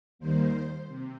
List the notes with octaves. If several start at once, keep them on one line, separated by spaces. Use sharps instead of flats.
D#2 D#3 G3 A#3 C5
C3